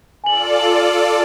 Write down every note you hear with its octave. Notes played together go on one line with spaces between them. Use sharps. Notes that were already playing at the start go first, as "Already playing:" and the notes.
F4 A4 D5 G#5 F#7